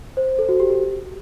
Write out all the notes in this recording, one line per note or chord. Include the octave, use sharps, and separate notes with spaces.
C5
A4
F#4
G4
G4